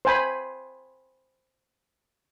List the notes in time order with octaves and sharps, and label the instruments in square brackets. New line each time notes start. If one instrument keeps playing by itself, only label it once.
[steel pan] C5 G#5 B5